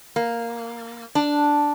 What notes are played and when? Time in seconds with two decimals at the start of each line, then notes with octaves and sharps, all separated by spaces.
0.16 A#3
1.15 D4